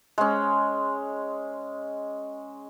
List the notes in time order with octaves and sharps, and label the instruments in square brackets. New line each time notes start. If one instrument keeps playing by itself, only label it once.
[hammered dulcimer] G#3 C#4